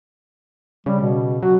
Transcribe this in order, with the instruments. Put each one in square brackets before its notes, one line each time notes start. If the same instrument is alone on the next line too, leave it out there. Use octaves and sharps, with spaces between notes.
[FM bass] C#3 [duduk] G3
[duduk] B2
[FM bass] F#3 [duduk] F#4